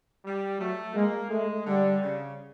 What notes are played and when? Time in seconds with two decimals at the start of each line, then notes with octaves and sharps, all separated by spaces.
0.25 G3
0.60 F#3 A3
0.95 G#3 A#3
1.30 G#3 A3
1.66 D3 G3
2.02 C#3